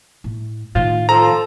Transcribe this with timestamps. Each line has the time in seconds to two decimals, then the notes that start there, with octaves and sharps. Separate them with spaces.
0.24 A2
0.75 A2 D#3 F4
1.09 F3 A4 A#5